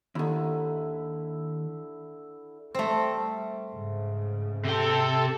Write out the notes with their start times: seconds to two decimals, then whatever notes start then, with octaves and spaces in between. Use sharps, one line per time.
0.15 D#2 D3 D#3 E4
2.74 G3 A3 C4
3.71 G#2 C#3
4.65 C3 A4 G5